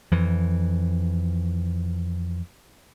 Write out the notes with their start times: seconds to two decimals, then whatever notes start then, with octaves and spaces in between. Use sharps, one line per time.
0.11 F2 E3